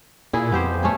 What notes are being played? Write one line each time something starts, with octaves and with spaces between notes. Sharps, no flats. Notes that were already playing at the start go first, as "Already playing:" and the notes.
A#2 E4 G#4
F2 B3 G4 C5
A3 C#4 G#4